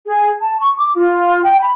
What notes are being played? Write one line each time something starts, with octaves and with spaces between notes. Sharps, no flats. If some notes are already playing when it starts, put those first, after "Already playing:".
G#4
A5
C#6
D6
F4
G5
B5